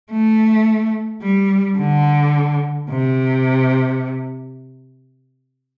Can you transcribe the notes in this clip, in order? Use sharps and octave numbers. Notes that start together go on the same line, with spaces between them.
A3
G3
D3
C3